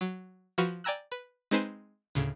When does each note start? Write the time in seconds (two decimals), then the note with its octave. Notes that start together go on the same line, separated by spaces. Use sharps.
0.01 F#3
0.58 F3 F#4 B4 F5 C#6 G6
0.84 D5 G5 G#5 A#5 E6 F#6
1.12 B4
1.51 G#3 C4 D#4 B4 C5 G#5
2.15 D2 A2 C#3